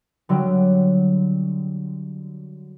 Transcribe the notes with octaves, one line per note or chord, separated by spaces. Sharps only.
D3 F#3 G3